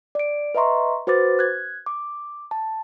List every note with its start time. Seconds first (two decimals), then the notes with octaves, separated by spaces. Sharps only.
0.15 D5 D7
0.55 B4 D#5 E5 A#5 C6 C#6
1.07 F#4 B4 C5 D6 A6
1.39 F#6 G#6
1.86 D6
2.51 A5